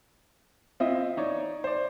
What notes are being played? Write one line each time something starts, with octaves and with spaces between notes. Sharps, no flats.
C4 E4 F4 D#5 E5
D#4 C#5 D5
C5 D5